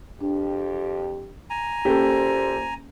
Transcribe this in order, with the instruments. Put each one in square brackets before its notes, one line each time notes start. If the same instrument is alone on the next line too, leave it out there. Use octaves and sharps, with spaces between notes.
[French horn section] F2 G4 [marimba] D4
[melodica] G#5 A#5
[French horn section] F#2 A#2 C5 [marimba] A#3 C#4 [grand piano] G4 A4